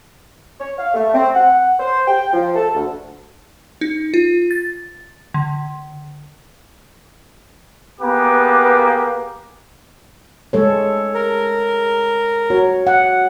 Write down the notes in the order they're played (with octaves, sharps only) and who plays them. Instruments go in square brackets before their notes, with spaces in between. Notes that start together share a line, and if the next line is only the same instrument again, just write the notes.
[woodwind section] C#5
F5
A3
C4
F#5
C5
G5
F3
A4
D2
[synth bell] D#4
F4
A6
D3
[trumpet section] A#3 B3 G4 G#4 B4 D6
[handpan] G#3 A4 C#5
[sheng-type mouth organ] A#4
[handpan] F#4 C#5
F#5